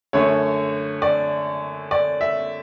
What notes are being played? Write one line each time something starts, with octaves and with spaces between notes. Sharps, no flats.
F#2 D3 A3 C#5
D5
D5
E5